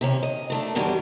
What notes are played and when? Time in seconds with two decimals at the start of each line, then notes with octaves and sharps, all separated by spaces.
0.01 C3 D#3 C#4
0.23 D#5
0.50 D#3 A3 D4
0.75 F#2 B2 D#3 E3 G3 G4